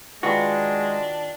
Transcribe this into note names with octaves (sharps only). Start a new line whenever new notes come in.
D#3 G#3 D4 F4 F#4 B4